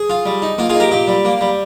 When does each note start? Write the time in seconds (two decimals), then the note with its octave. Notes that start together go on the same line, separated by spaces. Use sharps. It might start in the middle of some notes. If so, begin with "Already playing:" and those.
Already playing: G#4
0.10 F4
0.26 G3
0.42 D#4
0.58 A#3 F4
0.69 D#4 F4 G#4
0.80 G4 A#4
0.91 A#2 G4
1.08 G3
1.25 A#3
1.41 G3